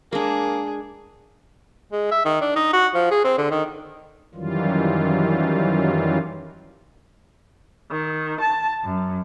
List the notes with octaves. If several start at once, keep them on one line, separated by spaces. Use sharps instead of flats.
G#3 A#3 D4 G#4
G#3
E5
D#3
D4
D#4
F#4
F3
G#4
C4
D3
D#3
F#2 D#3 E3 F#3 G3 F4
D#3
A5
F#2